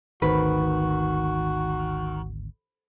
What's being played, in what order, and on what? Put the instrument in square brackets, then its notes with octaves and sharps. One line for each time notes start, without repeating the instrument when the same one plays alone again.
[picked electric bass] G#1 D2 [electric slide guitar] D#3 [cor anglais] F#4 [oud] B4